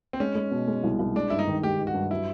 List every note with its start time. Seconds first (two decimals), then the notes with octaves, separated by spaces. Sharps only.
0.13 C4
0.20 G#3 C#4
0.35 G#3
0.51 B2
0.67 G#3
0.84 C2
0.99 C2
1.16 G#3 D4
1.30 G2 E4
1.39 D#4
1.47 D#3
1.63 G#3 G4
1.79 D#3
1.87 F#4
1.94 G2
2.11 F#3 E4